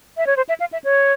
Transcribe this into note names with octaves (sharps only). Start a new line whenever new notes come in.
E5
C#5
C5
E5
F5
E5
C#5